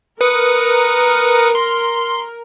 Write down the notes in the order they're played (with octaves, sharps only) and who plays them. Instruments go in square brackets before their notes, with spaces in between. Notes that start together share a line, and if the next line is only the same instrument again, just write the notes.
[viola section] A#4 [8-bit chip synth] B4 D#6 C#7
[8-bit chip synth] C6